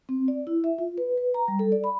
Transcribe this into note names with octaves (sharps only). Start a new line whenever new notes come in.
C4
D5
E4
E5
F4
B4
B4
A#5
G3
A4
D5
B5